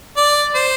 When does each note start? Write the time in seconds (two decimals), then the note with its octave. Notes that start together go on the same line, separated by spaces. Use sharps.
0.17 D5
0.55 C5